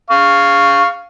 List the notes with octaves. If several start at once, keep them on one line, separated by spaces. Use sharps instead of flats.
F5 C#6